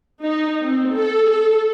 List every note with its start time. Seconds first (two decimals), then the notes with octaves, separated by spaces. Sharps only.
0.23 D#4
0.63 C4
0.94 A4
1.28 A4